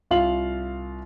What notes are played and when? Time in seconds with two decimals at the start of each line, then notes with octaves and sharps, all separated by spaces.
0.11 C2 F4 F5 F#7